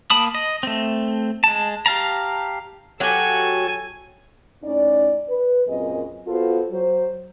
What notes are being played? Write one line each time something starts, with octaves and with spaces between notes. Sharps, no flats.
A#3 A5 B5 D#6
D#5
A3 C4
G#3 A5
G4 F5 A5 A#5
F#3 F#4 G4 A4 G#5
A2 C#4 D#4 D5
B4
F#2 A#2 C4 G#4 D#5
B3 F4 F#4 A4 C5
F#3 C5